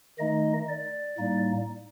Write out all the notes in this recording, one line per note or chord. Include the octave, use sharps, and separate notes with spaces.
D#3 A3 D#4 D#5
D5
A2 G3 A#3 D#4